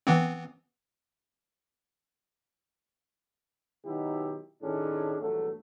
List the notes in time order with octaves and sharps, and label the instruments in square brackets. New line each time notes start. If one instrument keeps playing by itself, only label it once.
[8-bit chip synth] E3 B3 C4
[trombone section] B2 D#3 F#3 D#4 E4 G4
A2 D#3 C#4 D4 G#4
A#1 E2 G2 F#3 A3